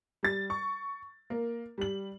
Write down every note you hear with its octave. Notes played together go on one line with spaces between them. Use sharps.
G3 A6
C#6
A#3
G3 F#7